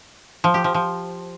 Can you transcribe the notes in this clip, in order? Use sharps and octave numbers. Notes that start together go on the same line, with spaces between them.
F3
G4
F3
F3